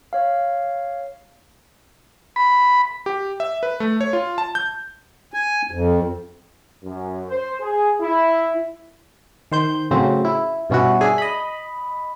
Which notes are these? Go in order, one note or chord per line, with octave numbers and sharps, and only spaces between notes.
C#5 F5
B5
G4
E5
B4
A3
C#5
F4
A5
G6
G#5
F2
F#2
C5
G#4
E4
D#3 C5 G6
A2 C#3 F#3 C4
E4
G2 B2 C#4 E4 F#4
D4 G#4 E5
D#5 B5